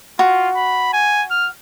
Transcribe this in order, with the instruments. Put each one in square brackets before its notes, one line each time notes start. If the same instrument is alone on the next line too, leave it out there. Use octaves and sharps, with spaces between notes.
[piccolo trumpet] F4 [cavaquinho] F#4
[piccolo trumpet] B5
G#5
F6